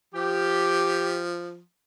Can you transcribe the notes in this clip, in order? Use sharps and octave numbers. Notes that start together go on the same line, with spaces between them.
F3 G4